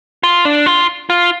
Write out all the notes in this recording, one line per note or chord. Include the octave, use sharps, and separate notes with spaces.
F4
D4
F4
F4